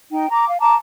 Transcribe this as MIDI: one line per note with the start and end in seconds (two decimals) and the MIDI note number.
0.11 0.29 63
0.11 0.29 79
0.30 0.48 82
0.30 0.48 86
0.48 0.59 77
0.60 0.75 81
0.60 0.75 82
0.60 0.75 86